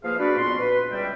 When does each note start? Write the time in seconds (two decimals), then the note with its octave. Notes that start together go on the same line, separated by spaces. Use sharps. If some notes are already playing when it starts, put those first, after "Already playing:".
0.03 F3 A#3 G#4 B4 F5
0.19 D4 F#4 B4 D5
0.37 F2 A#2 B3 F#4 C6
0.59 B4
0.91 C#2 G3 B4 D5 E5 G5